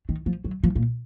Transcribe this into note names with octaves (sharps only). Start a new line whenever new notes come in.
D#3
F3
F#3
F3
A#2